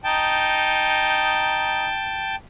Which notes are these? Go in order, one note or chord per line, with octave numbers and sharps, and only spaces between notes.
D#4 G5 A5